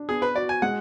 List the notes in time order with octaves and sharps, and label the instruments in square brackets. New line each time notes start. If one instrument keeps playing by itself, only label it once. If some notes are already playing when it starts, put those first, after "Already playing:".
Already playing: [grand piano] D4
[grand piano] B3 [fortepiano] G#4
[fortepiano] B4
[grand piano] F#4 [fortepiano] D5
[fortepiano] G#5
[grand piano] G#3 [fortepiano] F#5